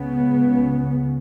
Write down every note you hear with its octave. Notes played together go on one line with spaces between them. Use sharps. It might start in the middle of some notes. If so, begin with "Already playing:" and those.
Already playing: C#2 C#3 B3